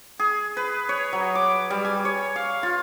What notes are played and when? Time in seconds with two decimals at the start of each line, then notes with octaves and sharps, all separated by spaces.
0.20 G#4
0.57 B4
0.89 C#5
1.13 F#3
1.35 D6
1.70 G3
1.85 G#5
2.05 C#5
2.36 F5
2.63 F4